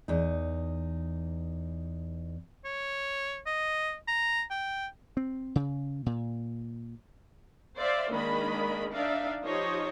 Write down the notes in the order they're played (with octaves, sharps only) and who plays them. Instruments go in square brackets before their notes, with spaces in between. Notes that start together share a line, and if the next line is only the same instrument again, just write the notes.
[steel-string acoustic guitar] E2 D#4
[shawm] C#5
D#5
A#5
G5
[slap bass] C4
C#3
A#2
[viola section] C5 D5 E5 F5
D#3 G#3 A#3 D4 D#5 B5
D4 D#4 D5 E5 F5
F3 D#4 G4 C5 C#5 D#5